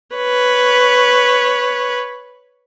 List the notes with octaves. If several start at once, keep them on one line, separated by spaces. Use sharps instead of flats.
B4 C#5